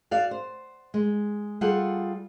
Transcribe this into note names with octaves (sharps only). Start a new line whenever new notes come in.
F#4 D5 F5
C5
G#3
G3 F4 G#4 A4 F#5